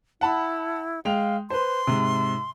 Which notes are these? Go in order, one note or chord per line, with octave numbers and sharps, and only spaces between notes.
E4 F#5 A5 B5
G#3 F5 G5 F7
B4 C5 C6
G#2 C3